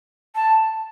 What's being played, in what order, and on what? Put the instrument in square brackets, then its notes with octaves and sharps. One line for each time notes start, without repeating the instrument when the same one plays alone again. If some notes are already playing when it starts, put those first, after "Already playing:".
[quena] A5